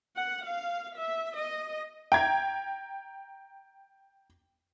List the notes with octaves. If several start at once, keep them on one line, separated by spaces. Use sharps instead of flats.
F#5
F5
E5
D#5
G5 A#5 G#6